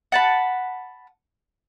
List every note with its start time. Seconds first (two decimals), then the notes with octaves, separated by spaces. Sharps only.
0.12 F#5 A5 B5